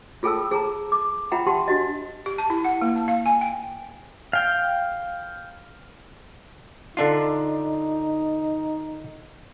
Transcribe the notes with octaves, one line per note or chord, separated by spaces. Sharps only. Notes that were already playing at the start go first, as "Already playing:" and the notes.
F4 G#4 A4 G5 A5 E6
G#4 A5 A#5
D6
F4 E5 F#5 G5 A#5 B5
G4 F#5 A5 C6
D4 F#4 D#5
G4
A5
E4
F#5
A#3
A5
F5
G#5
G5
F5 G5
D3 D4 D#4 F4